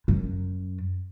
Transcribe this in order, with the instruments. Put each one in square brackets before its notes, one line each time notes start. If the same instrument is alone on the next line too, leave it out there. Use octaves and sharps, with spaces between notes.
[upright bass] F#2